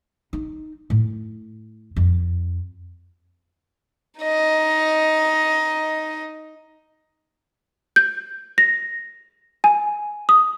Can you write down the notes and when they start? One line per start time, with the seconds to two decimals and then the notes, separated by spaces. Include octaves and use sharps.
0.33 D#4
0.90 A2
1.96 F2
4.21 D#4 D#5
7.96 G6
8.58 A#6
9.64 G#5
10.29 D#6